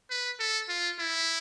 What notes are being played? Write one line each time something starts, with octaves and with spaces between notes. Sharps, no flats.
B4
A4
F4
E4